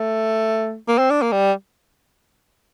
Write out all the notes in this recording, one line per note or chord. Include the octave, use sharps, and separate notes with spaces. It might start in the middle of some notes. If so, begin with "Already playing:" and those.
Already playing: A3
A#3
C4
D4
A#3
G3